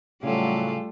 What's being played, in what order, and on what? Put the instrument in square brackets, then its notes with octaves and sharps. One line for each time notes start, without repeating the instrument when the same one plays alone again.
[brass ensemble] A2 F#3 [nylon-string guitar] C#3 [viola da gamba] G3 F4 A4 [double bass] A3